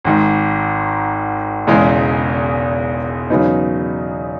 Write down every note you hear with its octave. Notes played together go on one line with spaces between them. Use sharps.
G#1 G#2 D#3
E1 E2 C#3 E3 G#3
E2 C#3 F#3 B3 D#4